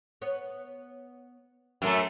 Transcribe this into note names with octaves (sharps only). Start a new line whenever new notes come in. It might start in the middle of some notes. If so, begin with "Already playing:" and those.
B3 C#5
F#2 F#3 A3 C#4 A#4